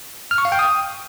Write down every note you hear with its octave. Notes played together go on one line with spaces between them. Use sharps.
F6
C#6
F5
G5
D#6